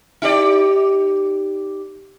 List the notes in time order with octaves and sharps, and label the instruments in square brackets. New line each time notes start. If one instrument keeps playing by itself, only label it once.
[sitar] D#4 G4 D5